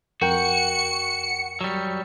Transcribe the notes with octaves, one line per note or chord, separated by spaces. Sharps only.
F2 F#4 A#4 G5 C#7
F#3 G3